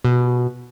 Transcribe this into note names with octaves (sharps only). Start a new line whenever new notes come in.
B2